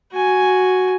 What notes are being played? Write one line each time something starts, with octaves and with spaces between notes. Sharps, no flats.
F#4 G#5